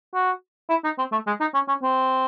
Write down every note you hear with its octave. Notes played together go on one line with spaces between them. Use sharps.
F#4
E4
D#4
C4
A3
G#3
D#4
C#4
C#4
C4